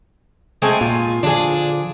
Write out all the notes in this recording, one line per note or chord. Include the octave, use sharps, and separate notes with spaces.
G#3 A3 C4 G#5
A#2 F4
D3 F3 D4 G#4